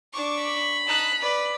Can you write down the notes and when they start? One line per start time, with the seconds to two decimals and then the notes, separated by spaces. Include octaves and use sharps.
0.13 D4 C#6 D6
0.43 B5
0.87 D#4 A5 F#6
1.21 B4 D5